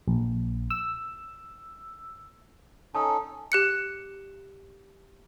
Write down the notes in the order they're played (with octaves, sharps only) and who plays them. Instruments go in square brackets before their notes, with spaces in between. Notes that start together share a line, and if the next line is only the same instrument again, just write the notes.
[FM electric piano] A#1
E6
[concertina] C#4 D#4 A4 [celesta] A5 D#6
[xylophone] G4 F#6 C#7